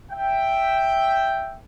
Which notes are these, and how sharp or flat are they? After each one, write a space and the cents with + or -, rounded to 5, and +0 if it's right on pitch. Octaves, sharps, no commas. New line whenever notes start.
E5 +0 G5 +0